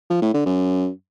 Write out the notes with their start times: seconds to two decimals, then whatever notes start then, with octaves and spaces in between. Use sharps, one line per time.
0.10 F3
0.22 A2
0.34 D3
0.46 F#2